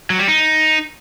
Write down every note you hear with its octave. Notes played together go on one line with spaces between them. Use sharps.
F#3
G3
D#4